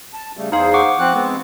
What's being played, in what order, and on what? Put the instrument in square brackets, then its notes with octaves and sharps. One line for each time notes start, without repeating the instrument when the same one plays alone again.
[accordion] A5
C#3 G3 A3
[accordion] E2 G#4 C5 [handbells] D#4 F5
[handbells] F#5 C#6 D6
[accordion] F3 C4 F#6
G#3 B3 C4